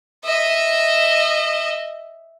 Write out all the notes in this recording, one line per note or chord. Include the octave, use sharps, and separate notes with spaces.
D#5 E5